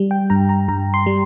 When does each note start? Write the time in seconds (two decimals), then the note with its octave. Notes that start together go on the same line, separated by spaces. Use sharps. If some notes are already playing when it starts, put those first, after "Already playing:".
Already playing: G3
0.11 G5
0.30 G2 A#5
0.49 A#5
0.68 G2 A#5
0.94 C6
1.06 G3